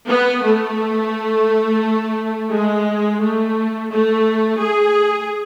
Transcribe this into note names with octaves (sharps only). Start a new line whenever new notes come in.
B3
A3
G#3
A3
A3
G#4